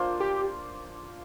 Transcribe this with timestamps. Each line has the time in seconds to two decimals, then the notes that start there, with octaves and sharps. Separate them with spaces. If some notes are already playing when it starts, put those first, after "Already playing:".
Already playing: A#3 D4 F4 C5
0.20 G4